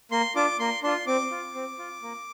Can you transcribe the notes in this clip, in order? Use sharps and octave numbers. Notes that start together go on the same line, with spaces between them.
A#3 C6
D4 F4 D6
A#3 C6
D4 F4 C6
C4 D6
F4
C4
F4
A#3